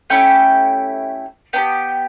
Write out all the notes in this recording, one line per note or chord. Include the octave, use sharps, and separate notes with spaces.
A3 C#4 E4 G4 G5
B3 D4 G4 G5